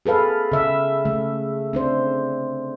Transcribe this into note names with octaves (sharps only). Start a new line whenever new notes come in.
G#4 A4 B4 F5
C#3 E5
C#3 A3
C4 D4 C5